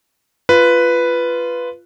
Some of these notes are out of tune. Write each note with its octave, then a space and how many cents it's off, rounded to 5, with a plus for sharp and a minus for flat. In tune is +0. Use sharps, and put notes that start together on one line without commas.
F4 -15 B4 +0